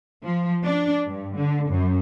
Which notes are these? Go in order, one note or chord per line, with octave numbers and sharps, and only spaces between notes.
F3
D4
G2
D3
F#2